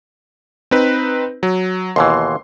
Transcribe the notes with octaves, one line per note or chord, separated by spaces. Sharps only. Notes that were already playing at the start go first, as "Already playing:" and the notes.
C4 D#4 B4
F#3
D#2 B2 E3 C6